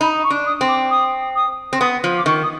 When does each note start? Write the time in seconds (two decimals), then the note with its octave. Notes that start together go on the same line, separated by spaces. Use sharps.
0.01 D#4 B5
0.23 C#6
0.31 D4
0.46 D#6
0.61 C4
0.68 D6
0.91 D#6
1.36 D#6
1.73 C4
1.81 B3 D#6
2.04 F3
2.18 D6
2.26 D#3 C#6
2.43 D#6